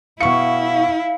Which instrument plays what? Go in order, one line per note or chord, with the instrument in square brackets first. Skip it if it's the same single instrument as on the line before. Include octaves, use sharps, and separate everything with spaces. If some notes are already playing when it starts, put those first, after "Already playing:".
[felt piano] B2 C#6 C#7 [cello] E4 [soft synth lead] F5